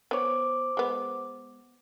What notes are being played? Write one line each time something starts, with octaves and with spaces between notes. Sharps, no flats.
B3 C5 C#5 D6
G#3 B3